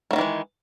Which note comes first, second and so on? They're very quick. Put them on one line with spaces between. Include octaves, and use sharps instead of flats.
A3 F#3 D#3 E3 G#3